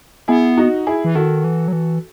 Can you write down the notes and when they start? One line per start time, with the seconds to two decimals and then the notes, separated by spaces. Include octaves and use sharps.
0.28 B3 E4 G#4
0.57 D#4 F#4
0.87 E4 G#4
1.05 E3
1.15 D#3 F#4 A4
1.44 E3
1.68 F#3
1.73 E3